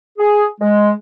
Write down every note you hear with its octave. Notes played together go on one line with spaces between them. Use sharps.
G#4
G#3